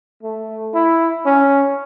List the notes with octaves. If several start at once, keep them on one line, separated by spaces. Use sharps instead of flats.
A3
E4
C#4